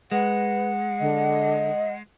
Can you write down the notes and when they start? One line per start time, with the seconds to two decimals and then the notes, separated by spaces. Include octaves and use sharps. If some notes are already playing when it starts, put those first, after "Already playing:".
0.12 G#3 B4 F#5
1.00 D3 D#5